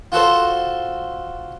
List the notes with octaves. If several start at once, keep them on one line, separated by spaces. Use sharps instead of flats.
F4 F#4 A4 C5